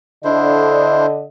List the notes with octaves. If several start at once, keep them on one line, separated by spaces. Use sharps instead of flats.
D3 D4 E4 C5 D#5